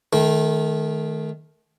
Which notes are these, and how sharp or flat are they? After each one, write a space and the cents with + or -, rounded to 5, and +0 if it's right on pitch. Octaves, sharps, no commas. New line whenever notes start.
D#3 +0 A3 -35